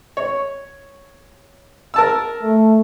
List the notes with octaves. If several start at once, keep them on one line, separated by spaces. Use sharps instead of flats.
C#5
A#4 A5 E6
A3